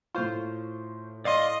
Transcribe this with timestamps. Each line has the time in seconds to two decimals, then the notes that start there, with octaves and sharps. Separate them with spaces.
0.15 A2 F4 C5 C#6
1.25 D5 D#5 F5 C6